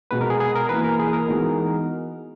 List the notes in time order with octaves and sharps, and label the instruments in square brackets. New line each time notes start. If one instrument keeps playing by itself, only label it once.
[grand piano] B2 G#3 B3 F#4 [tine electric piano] B4
[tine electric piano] A#4
G#4
G#4
A#4
[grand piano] E3 A#3 E4 [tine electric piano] B4
[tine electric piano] A#4
G#4
A#4
[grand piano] E3 G#3 B3 D#4 F#4